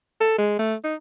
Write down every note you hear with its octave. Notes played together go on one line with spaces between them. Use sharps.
A4
G#3
A3
D#4